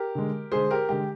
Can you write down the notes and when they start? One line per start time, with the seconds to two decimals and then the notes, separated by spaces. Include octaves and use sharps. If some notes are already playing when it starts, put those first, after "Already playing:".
Already playing: G4 A#4
0.15 D3 G#3
0.52 D3 G#3 G#4 C5
0.71 G4 A#4
0.89 D3 G#3 G4